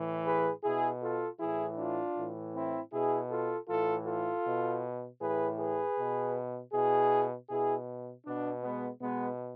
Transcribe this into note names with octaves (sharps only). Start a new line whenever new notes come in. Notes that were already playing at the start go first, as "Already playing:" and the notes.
Already playing: A2 E3
G#4 B4
B2 E4 G#4
F4 A4
A2 E3 E4 G#4
D4 F4
A2 E3
C4 E4
B2 E4 G#4
F4 A4
A2 E3 F4 A4
F4 A4
B2
A2 E3 G#4 B4
G#4 B4
B2
B2 E4 G#4
B2 E4 G#4
B2 B3 D4
G#3 B3
B2 G#3 B3